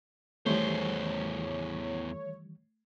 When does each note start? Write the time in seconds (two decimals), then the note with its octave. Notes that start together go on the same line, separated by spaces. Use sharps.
0.46 E2 D#3 E3 G3 A3 C5 C#5